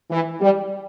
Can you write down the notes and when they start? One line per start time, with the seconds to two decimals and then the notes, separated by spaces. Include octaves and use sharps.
0.11 E3
0.41 G3